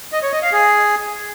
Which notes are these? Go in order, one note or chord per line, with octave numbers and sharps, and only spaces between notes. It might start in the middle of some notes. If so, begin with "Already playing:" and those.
D#5
C#5
D#5
F5
G#4